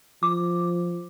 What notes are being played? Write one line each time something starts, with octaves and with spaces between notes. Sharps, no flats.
F3 D6